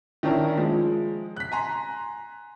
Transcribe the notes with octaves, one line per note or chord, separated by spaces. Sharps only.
D#3 C#4 D4 E4 A#4
F3 G#3
F#6 B6
G#5 A#5 C6